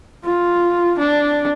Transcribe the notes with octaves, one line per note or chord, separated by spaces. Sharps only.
F4
D4